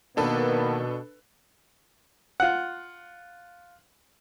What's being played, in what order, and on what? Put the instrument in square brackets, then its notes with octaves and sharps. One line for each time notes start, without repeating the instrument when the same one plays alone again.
[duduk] B2 [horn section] D#3 A#3 [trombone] B3 [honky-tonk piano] D4 A4 B4
[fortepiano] F4 F#5